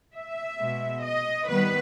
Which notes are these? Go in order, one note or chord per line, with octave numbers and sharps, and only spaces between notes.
E5
B2 G#3 B3
D#5
D#3 G3 B3 B4